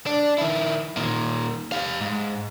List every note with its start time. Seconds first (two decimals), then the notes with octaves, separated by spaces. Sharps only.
0.07 D4
0.38 D#3 E4
0.97 A#2 D#3
1.72 G4 F5
2.01 G#2